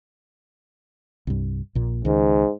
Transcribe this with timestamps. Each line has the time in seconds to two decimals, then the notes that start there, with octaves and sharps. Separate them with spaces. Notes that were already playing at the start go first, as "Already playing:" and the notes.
1.27 C2 G2
1.75 A#1 A#2
2.05 C#2 G#2 D#3